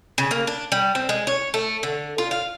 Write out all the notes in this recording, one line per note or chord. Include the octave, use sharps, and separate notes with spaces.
C#3
A#3
D4
G3
C4
G#3
C#5
A3
D3
F4
F5